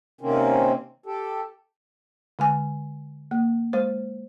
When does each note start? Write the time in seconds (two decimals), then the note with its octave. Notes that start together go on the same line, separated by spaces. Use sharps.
0.21 C3 D#3 A#3 C4 C#4
1.06 G4 A4
2.39 D3 G#3 G#5
3.31 A#3
3.73 G#3 C5